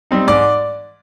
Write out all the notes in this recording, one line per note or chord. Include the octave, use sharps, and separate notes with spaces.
G3 C4 D#4
G#2 D5 D6